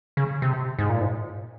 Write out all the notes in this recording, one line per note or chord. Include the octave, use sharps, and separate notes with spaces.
C#3
C3
G#2
A#2
G#2